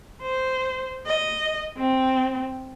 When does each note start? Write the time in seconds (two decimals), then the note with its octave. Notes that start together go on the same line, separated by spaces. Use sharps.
0.22 C5
1.06 D#5
1.77 C4